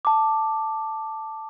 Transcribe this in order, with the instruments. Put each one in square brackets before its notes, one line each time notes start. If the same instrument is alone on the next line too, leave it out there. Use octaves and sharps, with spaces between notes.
[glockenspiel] A5 D6